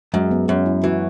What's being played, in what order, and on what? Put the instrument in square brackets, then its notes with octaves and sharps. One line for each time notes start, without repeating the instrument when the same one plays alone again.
[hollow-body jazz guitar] F#2 [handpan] G#3
[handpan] B3
[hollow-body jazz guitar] F#2 [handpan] C#4
[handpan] E4
[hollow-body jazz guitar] E3 [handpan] F#4